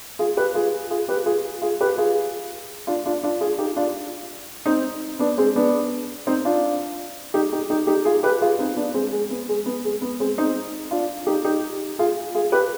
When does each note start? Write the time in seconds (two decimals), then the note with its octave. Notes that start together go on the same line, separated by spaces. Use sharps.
0.19 F4 G#4
0.37 G4 B4
0.54 F4 G#4
0.91 F4 G#4
1.08 G4 B4
1.26 F4 G#4
1.62 F4 G#4
1.81 G4 B4
1.98 F4 G#4
2.87 D4 F4
3.06 D4 F4
3.23 D4 F4
3.41 F4 G#4
3.58 D#4 G4
3.76 D4 F4
4.66 C4 D#4
5.19 B3 D4
5.38 G#3 C4
5.56 B3 D4
6.27 C4 D#4
6.45 D4 F4
7.34 D#4 G4
7.52 D#4 G4
7.70 D#4 G4
7.87 D#4 G4
8.05 F4 G#4
8.23 G4 B4
8.42 F4 G#4
8.59 C4 D#4
8.77 B3 D4
8.94 G#3 C4
9.12 G#3
9.30 B3
9.49 G#3
9.66 B3
9.85 G#3
10.02 B3
10.20 G#3 C4
10.38 C4 D#4
10.91 D4 F4
11.27 D#4 G4
11.45 D#4 G4
11.99 F4 G#4
12.35 F4 G#4
12.52 G4 B4